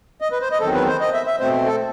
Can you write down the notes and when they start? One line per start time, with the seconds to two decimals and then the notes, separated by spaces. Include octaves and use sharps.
0.21 D#5
0.31 B4
0.42 C5
0.51 D#5
0.60 E2 D#3 F#3 C4 A4
0.74 B4
0.88 C5
1.01 D#5
1.13 E5
1.27 E5
1.40 B2 A3 C4 C5
1.67 A4